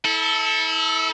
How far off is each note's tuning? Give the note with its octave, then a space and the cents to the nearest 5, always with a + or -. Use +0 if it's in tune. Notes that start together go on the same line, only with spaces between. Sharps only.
E4 -35 A4 +0